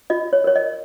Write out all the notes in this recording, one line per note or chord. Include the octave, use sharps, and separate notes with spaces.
F4 D#5
C#5
A#4 C#5
D#5